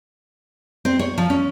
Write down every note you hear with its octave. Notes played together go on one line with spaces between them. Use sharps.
C4
C#5
F3
C#4